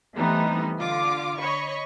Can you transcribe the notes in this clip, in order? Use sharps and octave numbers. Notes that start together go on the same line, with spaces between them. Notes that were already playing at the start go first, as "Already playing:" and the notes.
E3 G3 A3 B3 C4 D#4
D3 F4 D6
C#5 D#5 B5 C#6